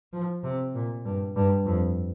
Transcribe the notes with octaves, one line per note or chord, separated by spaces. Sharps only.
F3
C3
A#2
G2
G2
F2